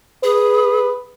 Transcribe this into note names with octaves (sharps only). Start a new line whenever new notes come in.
G#4 B4